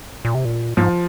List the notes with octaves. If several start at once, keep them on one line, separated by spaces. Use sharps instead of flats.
A#2
C3
A#2
G#2 F3